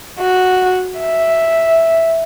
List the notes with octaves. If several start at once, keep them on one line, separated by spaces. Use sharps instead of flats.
F#4
E5